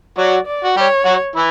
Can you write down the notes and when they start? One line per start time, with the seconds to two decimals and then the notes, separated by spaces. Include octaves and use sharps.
0.18 F#3 F#4 D5
0.47 D5
0.64 F#4
0.77 G3 G4 C#5
1.05 F#3 F#4
1.36 E3 E4